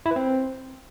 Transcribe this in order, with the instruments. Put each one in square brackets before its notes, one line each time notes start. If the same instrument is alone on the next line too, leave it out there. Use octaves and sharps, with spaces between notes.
[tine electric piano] E4
B4
C4